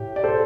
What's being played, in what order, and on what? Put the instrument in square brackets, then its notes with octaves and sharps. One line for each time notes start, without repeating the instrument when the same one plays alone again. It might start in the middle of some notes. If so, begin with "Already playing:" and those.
Already playing: [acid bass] A2 [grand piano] G4
[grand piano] D5
A4 C5